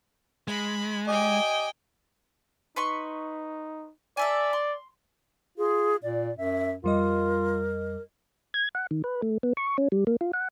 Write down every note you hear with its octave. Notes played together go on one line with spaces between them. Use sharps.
G#3 B5
G4 D5 D#5 G5 G#5
D#4 B4 C6 C#6
A4 D5 E5 G#5
C6
F4 G#4
A#2 D5
F#2 E5
F2 G3 F4 A#4 D#5
G#6
F#5
D#3
B4
A3
B3
C#6
C#4
G3
A#3
F4
F#5